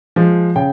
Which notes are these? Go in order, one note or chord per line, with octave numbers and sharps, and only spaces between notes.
F3 G#3
C#3 G5